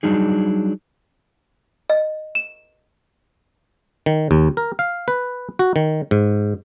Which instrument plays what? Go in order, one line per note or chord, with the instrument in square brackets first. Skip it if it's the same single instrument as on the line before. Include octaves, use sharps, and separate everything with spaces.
[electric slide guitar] F#3 G3 D4 D#4 G#4
[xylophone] D#5
E7
[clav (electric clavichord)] D#3
D#2
A#4
F5
B4
F#4
D#3
G#2